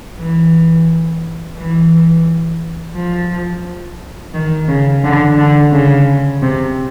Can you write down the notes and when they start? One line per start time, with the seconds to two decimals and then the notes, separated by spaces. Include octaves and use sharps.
0.18 E3
1.57 E3
2.95 F3
4.34 D#3
4.68 C#3
5.04 D3
5.38 D3
5.72 C#3
6.42 C3